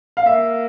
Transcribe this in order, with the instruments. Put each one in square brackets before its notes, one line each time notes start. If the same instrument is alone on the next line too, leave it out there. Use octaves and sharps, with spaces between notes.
[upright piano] F5
[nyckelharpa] A#3 [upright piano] E5